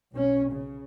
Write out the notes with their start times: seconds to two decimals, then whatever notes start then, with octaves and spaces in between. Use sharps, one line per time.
0.12 B1 C#4
0.52 C#3